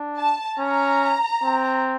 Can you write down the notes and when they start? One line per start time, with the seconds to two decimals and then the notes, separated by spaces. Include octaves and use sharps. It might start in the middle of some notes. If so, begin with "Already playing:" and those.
Already playing: D4
0.17 A5
0.59 C#4 A#5
1.43 C4